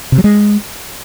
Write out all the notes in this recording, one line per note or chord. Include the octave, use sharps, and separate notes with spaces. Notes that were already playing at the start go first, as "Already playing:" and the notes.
C3
F#3
G#3